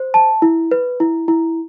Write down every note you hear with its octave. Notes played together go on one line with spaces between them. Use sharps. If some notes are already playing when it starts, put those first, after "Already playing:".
Already playing: C5
A5
E4
B4
E4
E4